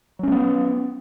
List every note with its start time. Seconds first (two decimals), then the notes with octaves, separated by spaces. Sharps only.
0.19 F#3
0.23 C#4
0.28 G#3
0.32 B3